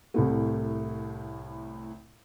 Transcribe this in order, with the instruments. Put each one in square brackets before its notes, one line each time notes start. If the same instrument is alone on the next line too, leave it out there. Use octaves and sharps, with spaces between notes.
[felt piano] C2 A2 A3